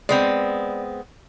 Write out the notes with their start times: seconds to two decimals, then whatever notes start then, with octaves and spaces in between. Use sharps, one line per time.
0.09 G#3 B3 C4 D5